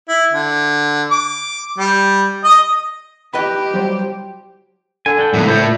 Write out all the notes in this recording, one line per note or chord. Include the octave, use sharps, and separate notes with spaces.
E4
D3
D6
G3
D#5
E4 G4 B4 D#5 B5
F#3 G3 C5
D3 G#5
D4 A4 G5
C#2 A2 F3 A#3 F#4
A2 C5 G6
A#2 D5